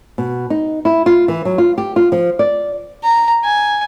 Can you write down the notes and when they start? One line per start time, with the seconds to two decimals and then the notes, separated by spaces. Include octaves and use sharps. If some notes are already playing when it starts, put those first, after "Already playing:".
0.18 B2
0.50 D#4
0.85 E4
1.06 F4
1.28 E3
1.45 F#3
1.58 F4
1.78 G4
1.96 F4
2.12 F3
2.39 D5
3.04 A#5
3.44 G#5